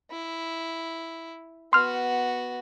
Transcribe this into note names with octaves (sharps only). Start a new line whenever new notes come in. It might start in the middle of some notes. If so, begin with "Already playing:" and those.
E4
B3 F#4 C6 F6